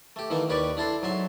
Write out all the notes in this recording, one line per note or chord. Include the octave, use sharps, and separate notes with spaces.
A3 G4
D#3 E3 A3 A#3 D#4
D#2 D#3 G4 B4 D5 C#6
D4 E4 A4 C6
G#2 F#3 E5 C6